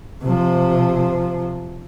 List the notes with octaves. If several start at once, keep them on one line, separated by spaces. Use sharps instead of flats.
C3 F3